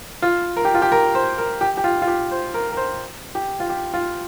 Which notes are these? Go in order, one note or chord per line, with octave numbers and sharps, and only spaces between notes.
F4
A#4
G4
F4
G4
A#4
C5
A#4
G4
G4
F4
F4
G4
C5
A#4
A#4
C5
G4
F4
G4
F4